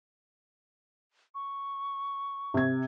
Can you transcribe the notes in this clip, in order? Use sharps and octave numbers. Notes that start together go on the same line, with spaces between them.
C#6
C3 G#6